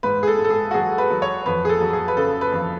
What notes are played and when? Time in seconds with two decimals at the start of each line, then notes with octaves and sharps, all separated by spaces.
0.03 G#2 B4
0.23 G#4
0.27 A4
0.39 G#2
0.44 A4
0.50 G#4
0.71 F#4
0.74 F#3 G#4
0.98 B4
1.10 F#3
1.22 C#5
1.46 F2 B4
1.65 G#4
1.69 A4
1.81 F#3
1.93 G#4
2.08 B4
2.17 C#3 A4
2.41 B4
2.52 F2